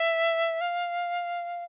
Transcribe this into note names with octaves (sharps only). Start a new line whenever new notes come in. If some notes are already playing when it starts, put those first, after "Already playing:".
Already playing: E5
F5